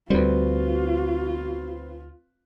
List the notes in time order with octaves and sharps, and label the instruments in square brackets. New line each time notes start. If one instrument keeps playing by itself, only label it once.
[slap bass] D2 G3 [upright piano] C4 B4 [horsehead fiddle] F4 [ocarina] F#4